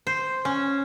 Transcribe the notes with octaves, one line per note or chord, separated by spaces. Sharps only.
C5
C#4